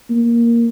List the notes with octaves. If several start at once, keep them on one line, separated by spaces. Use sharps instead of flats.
A#3